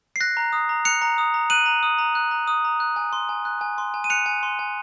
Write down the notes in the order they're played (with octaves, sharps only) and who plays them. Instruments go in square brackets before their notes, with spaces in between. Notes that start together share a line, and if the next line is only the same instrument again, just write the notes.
[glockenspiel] C7
F#6 A#6
A#5
D#6
A#5
F#6 C#7 F7
A#5
D#6
A#5
F#6 D#7 F#7
A#5
D#6
A#5
F#6
A#5
D#6
A#5
F#6
G#5
C6
G#5
F#6
G#5
C6
G#5
D#7
F#6 C#7 F7
G#5
C6
G#5